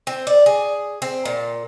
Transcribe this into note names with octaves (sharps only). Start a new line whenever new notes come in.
C4
D5
G#4
C4
A#2